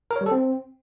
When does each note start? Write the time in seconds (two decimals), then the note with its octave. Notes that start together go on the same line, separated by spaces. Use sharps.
0.11 A#4
0.16 C#5
0.21 G3
0.26 A4
0.31 C4